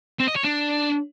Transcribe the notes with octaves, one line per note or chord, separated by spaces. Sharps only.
C4
D#5
C#5
D4